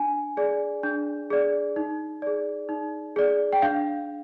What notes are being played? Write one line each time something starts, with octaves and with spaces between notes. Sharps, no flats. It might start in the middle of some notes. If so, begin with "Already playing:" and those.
Already playing: D4 G#5
G#4 D5
D4
G#4 D5
D#4
G#4 D5
D#4
G#4 D5
G5
D4 F5